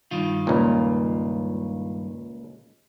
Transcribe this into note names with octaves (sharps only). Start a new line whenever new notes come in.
G2 D#3 F4
C#2 A#2